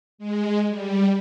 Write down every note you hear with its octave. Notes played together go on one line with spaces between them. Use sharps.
G#3
G3